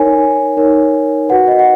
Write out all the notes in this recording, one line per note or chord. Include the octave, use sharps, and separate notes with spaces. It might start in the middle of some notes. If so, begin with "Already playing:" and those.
Already playing: D#4 A#4 C#5 G#5
D#4 A#4 C#5
F#4 B4 F#5
D#5
F#5